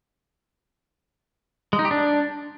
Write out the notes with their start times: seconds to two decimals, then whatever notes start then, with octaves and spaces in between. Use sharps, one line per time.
1.73 G#3
1.79 D#4
1.85 G4
1.91 D4